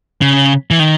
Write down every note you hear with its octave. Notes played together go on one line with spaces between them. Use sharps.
C#3
E3
D#3